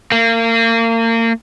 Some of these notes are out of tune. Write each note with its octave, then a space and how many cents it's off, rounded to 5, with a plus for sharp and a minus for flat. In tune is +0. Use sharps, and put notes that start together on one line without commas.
A#3 -35